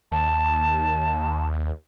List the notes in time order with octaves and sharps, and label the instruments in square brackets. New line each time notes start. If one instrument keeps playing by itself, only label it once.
[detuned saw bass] D#2 [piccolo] A5